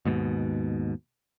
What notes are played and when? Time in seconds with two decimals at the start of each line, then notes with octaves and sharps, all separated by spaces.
0.05 D#2 G#2 B2